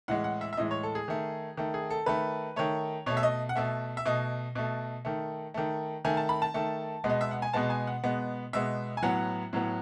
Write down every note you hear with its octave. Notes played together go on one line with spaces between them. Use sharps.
A2 E3 G#3 F#5
F#5
E5
E5
A2 E3 G#3 D#5
C#5
A4
G#4
D#3 A3
D#3 A3
G#4
A4
D#3 A3 B4
D#3 A3 C#5
B2 A3 C#5
E5
D#5
F#5
B2 A3 E5
E5
B2 A3 D#5
B2 A3
D#3 A3
D#3 A3
D#3 A3 G#5
A5
B5
A5
D#3 A3
B2 G#3 B3
D#5
E5
F#5
G#5
B2 G#3 B3 A5
G#5
F#5
B2 G#3 B3
B2 G#3 B3 E5
G#5
A2 F#3 B3 F#5
A2 F#3 B3